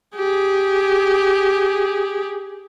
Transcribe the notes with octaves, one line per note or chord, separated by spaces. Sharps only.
G4 G#4